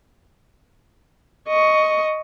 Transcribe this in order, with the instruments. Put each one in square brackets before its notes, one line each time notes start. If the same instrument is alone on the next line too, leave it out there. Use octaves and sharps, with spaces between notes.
[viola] D#5 C#6